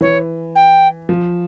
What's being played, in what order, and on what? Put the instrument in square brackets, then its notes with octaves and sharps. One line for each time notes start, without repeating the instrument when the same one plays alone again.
[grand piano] E3 [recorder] C#5
[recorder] G5
[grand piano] F3